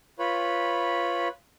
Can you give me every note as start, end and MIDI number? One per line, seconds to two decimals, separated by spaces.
0.19 1.28 65
0.19 1.28 71
0.19 1.28 73
0.19 1.28 83